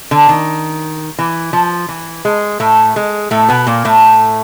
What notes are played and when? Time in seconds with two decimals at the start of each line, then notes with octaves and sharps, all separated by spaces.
0.11 D3
0.29 D#3
1.19 E3
1.53 F3
1.88 E3
2.25 G#3
2.60 A2 A3
2.96 G#3
3.31 A2 A3
3.49 B2 B3
3.67 A#2 A#3
3.85 A2 A3